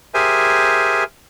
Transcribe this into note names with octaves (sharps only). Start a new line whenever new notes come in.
G4 G#4 A#4 C5 E5 G#5